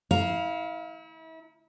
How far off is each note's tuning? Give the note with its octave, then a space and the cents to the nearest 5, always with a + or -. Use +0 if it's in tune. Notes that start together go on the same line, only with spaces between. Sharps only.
E4 -35 F5 +0 A#5 +0